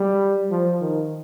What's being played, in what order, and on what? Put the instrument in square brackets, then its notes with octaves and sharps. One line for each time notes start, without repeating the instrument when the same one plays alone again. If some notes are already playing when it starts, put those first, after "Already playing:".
Already playing: [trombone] G3
F3
D#3